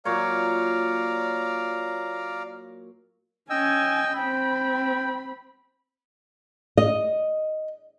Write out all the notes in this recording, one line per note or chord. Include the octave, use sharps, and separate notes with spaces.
A#2 F#3 C#5 D5 F5 A#5
C#4 D#5 G5 G#5 E6
C4 G5 B5
D#5